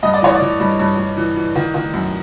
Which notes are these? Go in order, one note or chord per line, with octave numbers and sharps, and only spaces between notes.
G2 D#5
D5
E3 C#5
D5
E3
G2
G2
G2
E3
E3
D#3
D#3
F#2